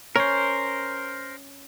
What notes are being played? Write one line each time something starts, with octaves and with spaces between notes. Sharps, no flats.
C#4 A#4 C5